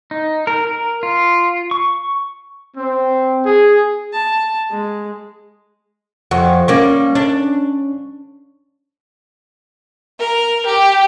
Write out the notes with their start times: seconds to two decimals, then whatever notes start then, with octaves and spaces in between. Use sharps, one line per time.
0.11 D#4
0.47 A#4
0.67 A#4
1.03 F4
1.71 C#6
2.77 C4
3.46 G#4
4.13 A5
4.70 G#3
6.31 F2 F#5 C#6
6.68 G3 A#3 C#4 C#6
7.15 D4
10.19 A#4
10.66 G4